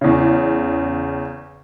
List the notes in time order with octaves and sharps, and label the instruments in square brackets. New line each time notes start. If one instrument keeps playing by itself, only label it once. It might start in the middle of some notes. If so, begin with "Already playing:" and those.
[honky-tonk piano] E2 C#3